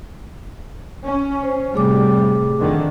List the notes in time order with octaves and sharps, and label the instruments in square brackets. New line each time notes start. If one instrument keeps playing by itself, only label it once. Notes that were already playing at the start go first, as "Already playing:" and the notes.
[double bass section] C#4
[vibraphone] C5
[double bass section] A2 C3 G3 [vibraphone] A3 G#4 D6
[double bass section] F2 D3 D#3